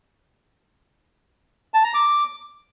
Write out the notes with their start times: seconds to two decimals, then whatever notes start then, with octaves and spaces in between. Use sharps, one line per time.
1.74 A5
1.84 A#5
1.94 D6